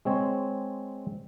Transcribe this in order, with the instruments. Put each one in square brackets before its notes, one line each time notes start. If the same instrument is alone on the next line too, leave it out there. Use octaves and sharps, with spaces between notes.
[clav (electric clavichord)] G#3 C4 C#5